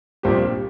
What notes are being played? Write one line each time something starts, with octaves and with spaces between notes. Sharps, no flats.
A#1 A#2 G3 C4 G4